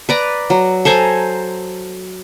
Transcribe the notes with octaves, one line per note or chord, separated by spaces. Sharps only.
B4 D5 A#5
F#3
A4 C5 G#5 A#5